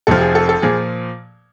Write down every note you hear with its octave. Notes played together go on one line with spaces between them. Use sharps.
F1 F2 C3 F3 A4
G#4
A4
A4
A#2 F3 G#4